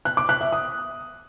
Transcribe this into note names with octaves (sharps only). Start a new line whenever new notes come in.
F#6
D6
F#6
E5
D#6